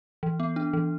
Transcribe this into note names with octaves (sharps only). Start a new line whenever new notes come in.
E3
B3
D4
E3